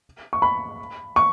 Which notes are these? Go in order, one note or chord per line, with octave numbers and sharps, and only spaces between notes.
C#6
B5
C#6